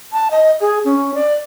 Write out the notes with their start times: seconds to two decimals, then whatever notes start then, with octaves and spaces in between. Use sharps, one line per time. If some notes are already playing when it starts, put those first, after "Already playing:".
0.13 A5
0.31 D#5
0.61 G#4
0.85 C#4
1.15 D5